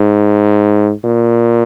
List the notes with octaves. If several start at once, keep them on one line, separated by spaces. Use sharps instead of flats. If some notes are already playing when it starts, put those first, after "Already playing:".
Already playing: G#2
A#2